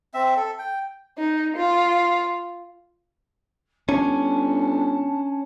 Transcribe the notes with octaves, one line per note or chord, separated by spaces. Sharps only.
C4 E5
A4
G5
D#4
F4
G1 C#4 D4 A5